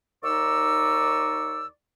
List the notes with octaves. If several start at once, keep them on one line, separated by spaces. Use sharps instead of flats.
D#2 D#4 D5 C#6 E6